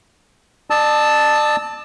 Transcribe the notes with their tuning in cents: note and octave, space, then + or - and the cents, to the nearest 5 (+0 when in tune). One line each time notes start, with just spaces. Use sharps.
D5 +40 A5 +0 E6 -30